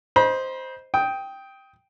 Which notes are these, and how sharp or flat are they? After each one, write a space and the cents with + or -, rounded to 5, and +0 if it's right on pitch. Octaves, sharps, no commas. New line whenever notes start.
C5 +0 D#5 +0 B5 -40
G5 +0 D#6 +25